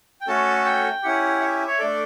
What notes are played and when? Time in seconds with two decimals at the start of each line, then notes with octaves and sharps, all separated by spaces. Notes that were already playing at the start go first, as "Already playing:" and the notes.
0.21 G5
0.27 A3 C#4 F#4 A4 A5
0.65 G5
1.03 C#4 E4 G4 F#5
1.41 E5
1.67 C#5
1.79 A3 D4 A4 D5